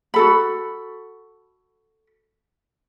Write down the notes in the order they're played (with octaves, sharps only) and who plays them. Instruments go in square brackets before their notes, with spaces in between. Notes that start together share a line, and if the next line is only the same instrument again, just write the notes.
[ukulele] F#4 A4 B5